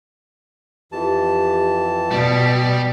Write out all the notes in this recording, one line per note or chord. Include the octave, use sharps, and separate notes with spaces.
F2 E3 G4 A5
B2 G3 D5